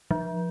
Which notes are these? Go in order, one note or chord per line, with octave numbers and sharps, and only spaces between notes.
F3